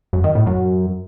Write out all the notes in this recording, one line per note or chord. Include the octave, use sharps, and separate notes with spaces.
F#2
D#3
A2
F#2